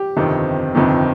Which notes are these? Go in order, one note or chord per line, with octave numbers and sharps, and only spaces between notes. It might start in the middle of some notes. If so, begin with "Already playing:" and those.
Already playing: G4
G1 F2 C3 D#3
G1 F2 C3 D#3